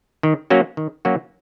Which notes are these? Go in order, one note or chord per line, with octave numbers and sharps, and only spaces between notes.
D#3
F#3 A#3 C#4 F#4
D#3
F#3 A#3 C#4 F#4